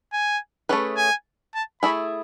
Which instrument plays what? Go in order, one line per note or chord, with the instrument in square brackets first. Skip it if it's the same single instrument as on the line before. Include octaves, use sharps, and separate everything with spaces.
[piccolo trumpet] G#5
[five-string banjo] A3 C#4 G#4 B4
[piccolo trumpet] G#5
A5
[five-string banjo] A3 E4 G#4 [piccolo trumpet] B5